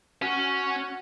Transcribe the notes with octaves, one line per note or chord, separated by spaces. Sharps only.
C#4 F#4